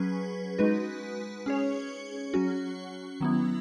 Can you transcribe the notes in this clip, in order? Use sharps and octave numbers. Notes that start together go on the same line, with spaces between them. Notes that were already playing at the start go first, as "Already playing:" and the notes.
Already playing: F#3 C#4 G#4 B4
G#3 D#4 F#4 B4
C#4 G#4 C#5
F#3 C#4 F#4
D#3 F#3 B3 E4